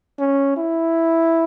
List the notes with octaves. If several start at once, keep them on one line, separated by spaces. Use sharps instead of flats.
C#4
E4